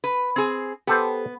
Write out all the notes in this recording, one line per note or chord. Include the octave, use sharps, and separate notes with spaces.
B4
C4 G#4
B3 G4 A4 C5